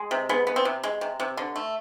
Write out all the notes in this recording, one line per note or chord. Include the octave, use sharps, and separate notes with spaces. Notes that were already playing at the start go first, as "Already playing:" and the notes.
Already playing: G#3
C3
G#3 B3
B3
C4
C3
G#3
C3
C3
D3
A3